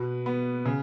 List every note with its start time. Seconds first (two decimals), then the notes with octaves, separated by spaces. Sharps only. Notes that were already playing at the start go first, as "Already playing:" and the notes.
Already playing: B2 B4
0.26 B3
0.66 C#3